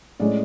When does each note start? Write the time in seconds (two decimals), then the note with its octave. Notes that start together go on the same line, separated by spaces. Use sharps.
0.20 A2 G#3 C#4 D5